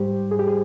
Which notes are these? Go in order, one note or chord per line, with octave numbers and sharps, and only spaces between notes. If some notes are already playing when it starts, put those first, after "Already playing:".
Already playing: G#2 G3 G4 C5
G#4
G4
G#4